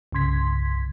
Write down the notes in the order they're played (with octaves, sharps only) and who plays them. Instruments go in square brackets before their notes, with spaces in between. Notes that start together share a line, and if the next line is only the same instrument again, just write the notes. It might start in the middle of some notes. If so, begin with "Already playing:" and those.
[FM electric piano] C2 G2 C#3 C6 G#6 B6